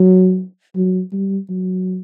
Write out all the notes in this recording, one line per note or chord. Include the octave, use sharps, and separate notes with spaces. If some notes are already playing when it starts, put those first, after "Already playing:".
Already playing: F#3
F#3
G3
F#3